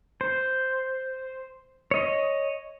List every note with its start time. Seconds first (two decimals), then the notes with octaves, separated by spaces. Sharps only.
0.21 C5
1.91 C#5 D#5